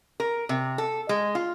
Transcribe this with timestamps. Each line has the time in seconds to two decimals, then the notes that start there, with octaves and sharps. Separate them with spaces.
0.20 A#4
0.49 C3
0.78 A4
1.09 G#3
1.35 F4